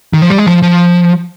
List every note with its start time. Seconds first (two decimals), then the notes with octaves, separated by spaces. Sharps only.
0.13 D#3
0.22 F3
0.30 G3
0.38 G#3
0.46 F3
0.62 F3